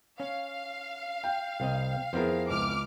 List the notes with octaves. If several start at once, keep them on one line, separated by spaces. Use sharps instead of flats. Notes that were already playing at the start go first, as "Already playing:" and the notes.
C#4 F5
G5
C2 C4 D#5
F2 B3 E4 G#4 A#4 C5
C#2 D6 F6